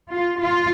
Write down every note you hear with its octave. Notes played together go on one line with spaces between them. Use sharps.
F4
F4